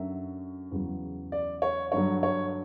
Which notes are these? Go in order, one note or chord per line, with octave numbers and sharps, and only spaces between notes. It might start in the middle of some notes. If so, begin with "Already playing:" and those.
Already playing: F#2 D3 F#3 E5
E2 C#3 F#3
D5
C#5
G2 D3 F#3 C#5
C#5